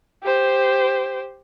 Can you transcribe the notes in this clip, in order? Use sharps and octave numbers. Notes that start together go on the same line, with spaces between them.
G4 C5